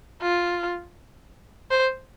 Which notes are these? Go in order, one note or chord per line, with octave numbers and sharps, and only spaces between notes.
F4
C5